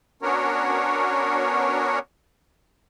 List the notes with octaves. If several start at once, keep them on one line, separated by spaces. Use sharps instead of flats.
B3 C#4 D4 F#4 A#4 C#5